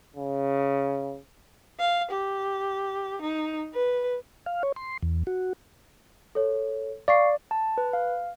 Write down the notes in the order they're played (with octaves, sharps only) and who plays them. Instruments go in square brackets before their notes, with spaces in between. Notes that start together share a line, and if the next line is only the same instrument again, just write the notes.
[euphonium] C#3
[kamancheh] F5
G4
D#4
B4
[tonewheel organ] F5
C#5
C6
E2
F#4
[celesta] A4 C#5
[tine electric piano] D5 [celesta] F5 C#6 C7
[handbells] A5
B4
F5